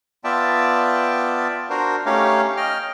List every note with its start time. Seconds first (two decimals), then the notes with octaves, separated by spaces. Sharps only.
0.24 B3 F4 D5 E5 G5 A5
1.70 D4 F#4 A#4 C5
2.06 A3 C#4 D#4 G4 C#5 F5
2.57 D#5 G5 F6